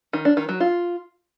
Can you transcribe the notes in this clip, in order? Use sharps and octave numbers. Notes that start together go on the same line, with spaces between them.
D#3
D4
D#3
F#3
F4